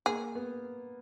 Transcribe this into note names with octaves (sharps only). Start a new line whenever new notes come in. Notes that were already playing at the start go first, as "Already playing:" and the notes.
A#3 G#4
B3